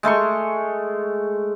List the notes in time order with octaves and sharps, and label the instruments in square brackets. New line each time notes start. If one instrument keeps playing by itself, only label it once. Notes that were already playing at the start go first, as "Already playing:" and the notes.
[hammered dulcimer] G#3 A3 C6 C#6